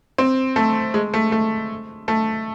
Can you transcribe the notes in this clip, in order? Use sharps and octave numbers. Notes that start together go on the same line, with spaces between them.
C4
A3
G#3
A3
A3
A3